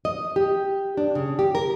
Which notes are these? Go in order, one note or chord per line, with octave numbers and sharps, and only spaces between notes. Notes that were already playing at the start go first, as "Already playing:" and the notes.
D#5
G4
D4
C#3
G4
A#4